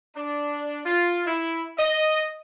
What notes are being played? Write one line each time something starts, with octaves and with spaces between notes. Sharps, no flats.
D4
F4
E4
D#5